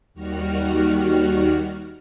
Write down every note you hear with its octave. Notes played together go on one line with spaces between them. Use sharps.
D#2 D#3 G3 F#4 F6